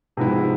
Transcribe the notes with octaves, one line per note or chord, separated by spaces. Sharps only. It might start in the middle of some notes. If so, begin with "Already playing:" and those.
G#2 C3 F3 B3 E4